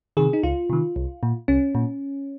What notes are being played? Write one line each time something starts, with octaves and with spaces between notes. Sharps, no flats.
C3 D#3 G#4
D#4
C#2 F4
C3 D#3
C2
A#2
C2 C#4
A#2